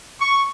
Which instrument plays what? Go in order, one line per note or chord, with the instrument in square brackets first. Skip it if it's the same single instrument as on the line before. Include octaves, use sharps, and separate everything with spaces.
[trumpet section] C#6